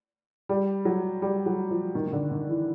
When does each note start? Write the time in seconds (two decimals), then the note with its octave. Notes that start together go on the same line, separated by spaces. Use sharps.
0.49 G3
0.85 F#3
1.22 G3
1.46 F#3
1.71 F3
1.95 D#3
2.07 D#3
2.12 D3
2.31 D#3
2.49 E3